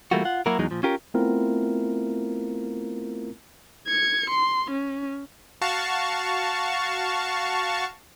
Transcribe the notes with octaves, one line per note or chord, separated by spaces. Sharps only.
E3 G3 A3 A#3 F4 F#4
F4 F#5
F#3 A#3 E4 F#4 A#4
E2 F#3 G#3 D#4
A#2 F3
C#4 F4 G4 A#4
A3 B3 C4 E4 F4 A#4
G#6 C#7
C6
C#4
F#4 F5 A5 C#6